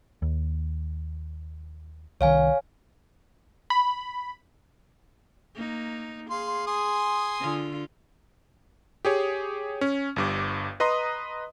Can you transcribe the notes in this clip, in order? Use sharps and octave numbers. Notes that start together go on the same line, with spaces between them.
D#2
C2 D#3 C#5 F5 G#5
B5
A#3 D#4
G#4 F5 C6
G#5 C6 D#6
D3 F4
G4 G#4 C#5
C#4
G1 G2 D6
B4 D#5 A#5 C6 D#6